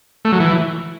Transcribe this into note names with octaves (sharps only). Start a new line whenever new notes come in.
A3
F#3
E3